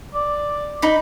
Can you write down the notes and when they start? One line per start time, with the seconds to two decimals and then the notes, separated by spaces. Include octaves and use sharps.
0.14 D5
0.82 D#4 B5